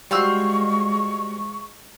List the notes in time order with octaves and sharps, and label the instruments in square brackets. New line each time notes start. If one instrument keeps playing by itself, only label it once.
[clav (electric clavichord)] G3 F#4 [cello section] G#3 [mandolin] F4 C5 E6 [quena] C#6